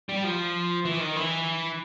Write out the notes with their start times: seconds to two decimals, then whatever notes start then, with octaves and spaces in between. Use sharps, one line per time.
0.09 G3
0.24 F3
0.85 E3
1.00 D#3
1.16 E3